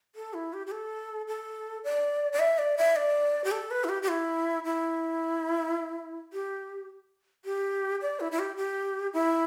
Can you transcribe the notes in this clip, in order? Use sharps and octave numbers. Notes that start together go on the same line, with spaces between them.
A4
E4
G4
G4
A4
A4
D5
D5
E5
D5
E5
D5
G4
A4
B4
E4
G4
G4
E4
E4
G4
G4
D5
E4
E4
G4
G4
E4